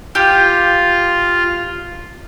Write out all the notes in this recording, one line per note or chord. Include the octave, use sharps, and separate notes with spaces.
F4 G4